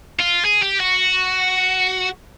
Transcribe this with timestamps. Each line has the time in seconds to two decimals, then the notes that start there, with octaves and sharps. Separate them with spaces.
0.19 F4
0.45 G#4
0.62 G4
0.80 F#4